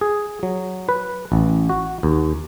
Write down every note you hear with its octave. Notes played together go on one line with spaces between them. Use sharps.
G#4
F#3
B4
A1
F#4
D#2